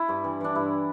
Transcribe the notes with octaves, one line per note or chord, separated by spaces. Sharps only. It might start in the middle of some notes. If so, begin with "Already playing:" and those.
Already playing: E4
G2
E3
E3 D4
G2 E4